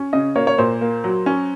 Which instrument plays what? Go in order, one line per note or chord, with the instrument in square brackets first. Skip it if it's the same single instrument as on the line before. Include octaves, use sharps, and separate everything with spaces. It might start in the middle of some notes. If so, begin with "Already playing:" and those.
Already playing: [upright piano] C#4
C#3 D#5
A#3 C#5
C#5
A#2 C5
A#3
F#3
C#4